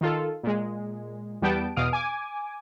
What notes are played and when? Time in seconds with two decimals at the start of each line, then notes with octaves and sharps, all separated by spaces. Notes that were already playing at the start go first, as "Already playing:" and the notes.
0.01 D#3 F4 A4
0.43 A#2 G#3
1.42 E2 G3 B3 G5 A5 D7
1.76 E2 B2 F5 D#6 F6 D7
1.93 G#5 D6